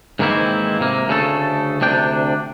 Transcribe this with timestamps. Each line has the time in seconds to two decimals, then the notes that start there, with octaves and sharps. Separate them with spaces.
0.19 G#2 D#3 E3 A#3 C4 E4
0.81 C3 A#3
1.08 D2 C#3 A3 A4
1.81 D2 C3 D4 G5